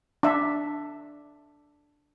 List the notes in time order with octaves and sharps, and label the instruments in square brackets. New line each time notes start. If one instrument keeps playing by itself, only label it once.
[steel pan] D4 E5